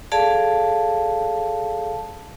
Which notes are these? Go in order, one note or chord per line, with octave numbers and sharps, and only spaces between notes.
G#4 A4 D5 F5 A5